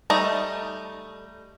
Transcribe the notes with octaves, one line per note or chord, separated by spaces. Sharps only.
G3 A3 D#4